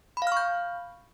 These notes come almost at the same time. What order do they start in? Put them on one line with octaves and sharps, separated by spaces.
B5 F5 F6 C#6 G6